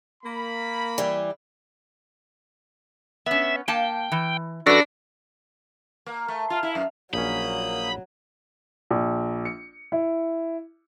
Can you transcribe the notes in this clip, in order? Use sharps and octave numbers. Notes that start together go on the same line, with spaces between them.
A#3 B5
E3 G3
B3 C#4 E5
A#3 F5 G5 A5
E3
F#2 D4 F#4 A4 B4 A#6
A#3
A3
F4
E4
F#2
A#1 F#3 A#3 C#4 B5 D#6 G6
A#1
C#7
E4